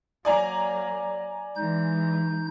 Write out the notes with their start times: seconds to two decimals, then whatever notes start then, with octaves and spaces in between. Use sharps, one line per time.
0.25 F#3 A#3 D5 G#5 A#5
1.56 E3 G#3 D#4 G6